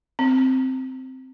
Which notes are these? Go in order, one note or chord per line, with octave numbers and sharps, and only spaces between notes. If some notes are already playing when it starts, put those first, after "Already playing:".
C4